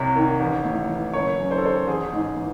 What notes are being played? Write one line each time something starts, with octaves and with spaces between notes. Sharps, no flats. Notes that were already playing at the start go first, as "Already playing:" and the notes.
Already playing: C2 C3 C#5
D#3
A1
A2
E3
F#1 C#5
F#2
C5
A4
D#3 C5
A1 G#4
G#2
E3